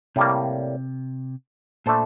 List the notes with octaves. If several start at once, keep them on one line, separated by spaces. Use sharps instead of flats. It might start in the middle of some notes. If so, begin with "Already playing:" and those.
A2 C3 G3 A#3
A#2 A3 D4 A4 C5